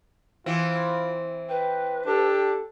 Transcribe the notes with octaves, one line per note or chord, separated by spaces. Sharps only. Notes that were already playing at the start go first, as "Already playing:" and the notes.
E3 C4 F4
B4 G5
D4 G4 A4